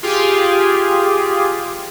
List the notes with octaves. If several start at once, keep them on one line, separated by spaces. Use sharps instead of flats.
F4 G4 G#4